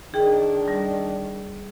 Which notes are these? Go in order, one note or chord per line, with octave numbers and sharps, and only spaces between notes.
D#3 D4 G#4 G5
G3